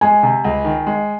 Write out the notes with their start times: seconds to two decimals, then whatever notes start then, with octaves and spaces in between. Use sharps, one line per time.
0.01 G#3 G#5
0.23 C3
0.44 C#2
0.65 D#3
0.87 G#3